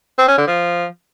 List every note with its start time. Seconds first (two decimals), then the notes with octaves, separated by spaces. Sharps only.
0.18 C4
0.28 C#4
0.38 D3
0.48 F3